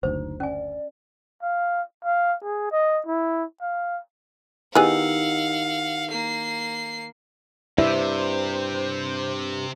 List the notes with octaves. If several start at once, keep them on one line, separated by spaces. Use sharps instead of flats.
F#1 D2 D#4 C5
C#4 D5 G#5
F5
F5
G#4
D#5
E4
F5
D#3 B3 E4 G4 G#4 F5 F#5 E6
A#3 C7
G2 C3 E4 C5 D5 E5